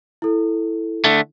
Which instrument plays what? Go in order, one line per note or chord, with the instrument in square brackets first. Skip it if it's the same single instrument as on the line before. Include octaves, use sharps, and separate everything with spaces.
[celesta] E4 A4
[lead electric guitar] D3 A3